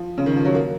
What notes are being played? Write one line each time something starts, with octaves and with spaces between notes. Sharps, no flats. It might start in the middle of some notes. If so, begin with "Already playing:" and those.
Already playing: F3
C#3
D#3
F3
F#3
A#3